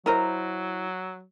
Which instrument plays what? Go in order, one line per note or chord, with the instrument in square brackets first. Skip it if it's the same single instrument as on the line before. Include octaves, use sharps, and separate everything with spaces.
[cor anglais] F#3 [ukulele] E4 C5 [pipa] A#4 D#5 A#5